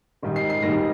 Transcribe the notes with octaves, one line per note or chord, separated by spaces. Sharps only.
G#2 D#3 G3
C7
C7
G#2 D#3 G3 A#6